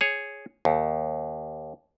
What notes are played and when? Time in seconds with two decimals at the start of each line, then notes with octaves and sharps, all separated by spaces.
0.01 G#4 C#5
0.65 D#2